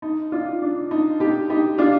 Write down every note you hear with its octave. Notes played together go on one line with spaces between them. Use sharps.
D#4
D4 F4
D4
D#4
D#4 G4
D#4 G4
D4 F4